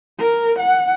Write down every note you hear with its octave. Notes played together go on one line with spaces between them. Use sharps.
A#4
F#5